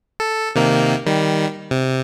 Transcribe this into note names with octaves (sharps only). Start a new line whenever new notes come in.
A4
C3 D#3 A#3
D#3 G3
C3